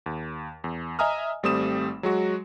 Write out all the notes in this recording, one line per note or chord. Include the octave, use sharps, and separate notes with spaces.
D#2
E2
D#5 E5 G#5 A#5 D#6 F6
G#1 G3 A3 C4 D#6 E7
F#3 G#3 F#4